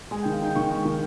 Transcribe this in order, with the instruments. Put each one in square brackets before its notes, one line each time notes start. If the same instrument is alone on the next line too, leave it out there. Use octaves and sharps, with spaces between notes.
[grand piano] G#3 G#5
G5
D#3
F5
D#4 G5
D#3 C#6
G#3
D#3